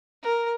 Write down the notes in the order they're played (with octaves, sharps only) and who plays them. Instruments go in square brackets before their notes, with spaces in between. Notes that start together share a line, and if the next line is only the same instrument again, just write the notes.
[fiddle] A#4